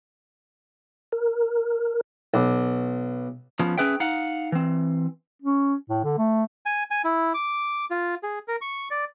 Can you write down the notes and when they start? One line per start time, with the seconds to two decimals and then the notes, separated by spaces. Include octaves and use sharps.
1.12 A#4
2.34 B1
3.59 F3 B3 C#4
3.78 C#4 G#4 B4 E5 G5
4.00 D#4 F5 F#5
4.52 E3 C4
5.42 C#4
5.89 A2
6.04 D3
6.18 A3
6.66 G#5
6.91 G#5
7.04 E4
7.34 D6
7.91 F4
8.23 G#4
8.48 A#4
8.61 C#6
8.91 D5